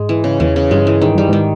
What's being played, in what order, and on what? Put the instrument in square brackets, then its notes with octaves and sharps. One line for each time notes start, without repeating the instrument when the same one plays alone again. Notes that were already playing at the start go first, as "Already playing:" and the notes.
Already playing: [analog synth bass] G#2 [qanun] G#3
[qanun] E3
C#3
[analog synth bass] E2 [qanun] E3
[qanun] C#3
[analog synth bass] G2 [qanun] G#3
[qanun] E3
[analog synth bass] G#2 [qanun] D#3
[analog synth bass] G2 [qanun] G3
[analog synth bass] G#2 [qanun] D#3